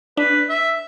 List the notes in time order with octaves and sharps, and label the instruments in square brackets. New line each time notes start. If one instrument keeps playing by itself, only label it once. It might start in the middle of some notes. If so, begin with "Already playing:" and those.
[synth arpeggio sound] D4 [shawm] B4
[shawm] E5